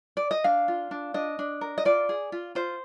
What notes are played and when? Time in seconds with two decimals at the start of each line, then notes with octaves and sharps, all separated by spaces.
0.17 D5
0.31 D#5
0.44 D4 F5
0.68 F4
0.91 D4
1.14 D4 D#5
1.39 D4
1.61 A#4
1.78 D#5
1.85 F4 D5
2.09 G#4
2.32 F4
2.55 F4 C5